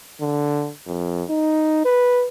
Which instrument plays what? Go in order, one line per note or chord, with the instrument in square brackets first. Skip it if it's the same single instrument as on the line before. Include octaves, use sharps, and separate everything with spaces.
[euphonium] D3
F2
D#4
B4